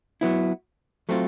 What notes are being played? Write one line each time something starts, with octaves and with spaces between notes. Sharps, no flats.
F#3 B3 E4
F#3 A3 C4 F4